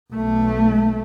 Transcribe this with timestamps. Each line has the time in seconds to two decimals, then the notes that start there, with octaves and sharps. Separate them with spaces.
0.12 B1 A3